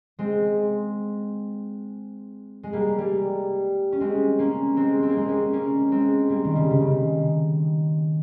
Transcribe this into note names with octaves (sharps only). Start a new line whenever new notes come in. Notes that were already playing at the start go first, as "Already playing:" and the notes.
G#3 C4
G#3
G3 A#3
G3 A#3
C#4
G#3 C4
A#3 C#4
G#3 C4
C4
A#3
G#3 C4
A#3 C#4
A#3 C#4
G#3 C4
G3 A#3
D#3
C#3
C#3
D#3